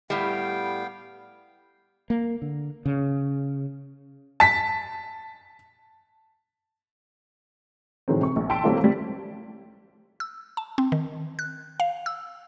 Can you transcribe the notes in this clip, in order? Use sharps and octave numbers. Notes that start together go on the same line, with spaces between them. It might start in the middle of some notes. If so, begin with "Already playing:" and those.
A2 G3 B3 F5 G5
A#3
D3
C#3
A5 B6
A2 D#3 E3 F#3 G#3 C4
C3 C#6
A#1
G5 A5 C6 E6 B6 D7
F#3 G3 A3 A#3 C4 E4
F3 G3
E6
A5
C4
D#3
F#6
F5
E6